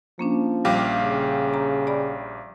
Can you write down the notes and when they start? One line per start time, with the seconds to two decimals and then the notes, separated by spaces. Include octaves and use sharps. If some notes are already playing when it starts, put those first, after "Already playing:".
0.19 F3 A#3 C#4 D4
0.65 A#1 G3 G4 F5 D6
1.02 C#3
1.54 A#5
1.87 D5 B5